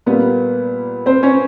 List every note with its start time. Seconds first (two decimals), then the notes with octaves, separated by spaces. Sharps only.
0.06 A#2 G3 A#3 B3 B4
1.06 C4 C5
1.23 C#4 C#5